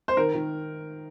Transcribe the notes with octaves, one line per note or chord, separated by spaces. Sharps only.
C5
D#3 A#4
D#3